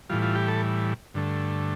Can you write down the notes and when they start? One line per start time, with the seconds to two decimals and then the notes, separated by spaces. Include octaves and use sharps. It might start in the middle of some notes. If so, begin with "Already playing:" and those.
0.10 A2 E3 G3 F4
0.22 F4
0.35 G4
0.48 A4
1.14 G2 D3 A3